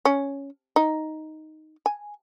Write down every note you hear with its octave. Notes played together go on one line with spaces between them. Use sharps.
C#4
D#4
G#5